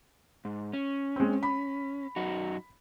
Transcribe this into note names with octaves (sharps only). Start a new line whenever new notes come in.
G#2
C#4
G#3 C4
B5
F#2 D#4 F#4